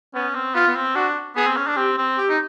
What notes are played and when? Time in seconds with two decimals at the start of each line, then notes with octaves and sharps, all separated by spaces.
0.14 B3 C#4
0.35 C4
0.55 B3 F4
0.67 B3
0.76 C4
0.95 D4 F#4
1.36 B3 G#4
1.46 C4
1.57 C#4
1.67 D4
1.76 C4 G4
1.97 C4
2.18 G4
2.29 D#4